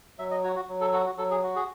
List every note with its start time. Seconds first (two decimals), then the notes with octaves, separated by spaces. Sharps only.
0.19 F#3 E5
0.31 D#5
0.44 F#4 C#5
0.56 F#4
0.69 F#3
0.81 A4
0.93 F#4 A4
1.06 F#4
1.18 F#3 A4
1.31 G#4
1.43 F#4
1.56 G#4